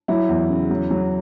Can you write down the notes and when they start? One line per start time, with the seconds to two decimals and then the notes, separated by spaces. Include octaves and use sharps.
0.08 F#3 E4
0.29 E2
0.49 C#3
0.71 F#3
0.91 F#3